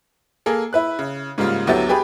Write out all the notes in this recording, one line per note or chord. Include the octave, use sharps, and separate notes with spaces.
A#3 G#4 A4
E4 B4 F#6
C#3
G#2 C#3 G3 A#3 F4
D2 F#3 B3 E4 G4 A6
G4 G#4 B4 G5